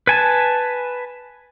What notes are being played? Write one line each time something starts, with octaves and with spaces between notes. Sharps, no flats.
B4 G#5 A5